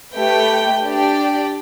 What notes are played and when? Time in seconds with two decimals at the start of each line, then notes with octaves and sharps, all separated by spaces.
0.16 A3 G4 B4 G5
0.85 D4 G4 D5 G5